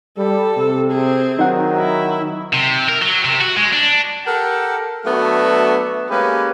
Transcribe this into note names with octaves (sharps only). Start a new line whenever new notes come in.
G3 A4
C3
C4 G#4
D#3 F#3 D#4 F#5
E4
C3
A#4
F#3
C3
F#4
G#3
D4
G4 A4 A#4 F#5 G5
F#3 A3 B3 D4 F#4 E5
G#3 A#3 C#4 G4 B4